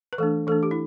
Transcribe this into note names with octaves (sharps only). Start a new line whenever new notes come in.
B4
E3 A3 D4 A4
E3 A3 D4 A4
G4
E4